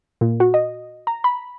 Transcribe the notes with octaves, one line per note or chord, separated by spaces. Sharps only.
A#2
F#4
D#5
A#5
B5